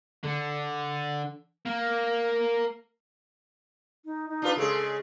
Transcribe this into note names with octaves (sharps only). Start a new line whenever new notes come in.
D3
A#3
D#4
D#4
D4 F4 B4
C#3 G#3 G#4 A4